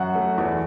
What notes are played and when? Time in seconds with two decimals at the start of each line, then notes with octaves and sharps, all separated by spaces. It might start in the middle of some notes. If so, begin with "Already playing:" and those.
Already playing: F#2 F#4 F#5
0.15 A3
0.38 E2